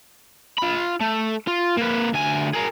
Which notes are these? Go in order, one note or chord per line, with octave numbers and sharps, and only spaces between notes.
F4 B5
A3
F4
A#3 B4
D2 G#5
G#4 A#4